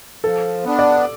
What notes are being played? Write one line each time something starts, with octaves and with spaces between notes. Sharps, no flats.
F3 A4
B3 D4
D5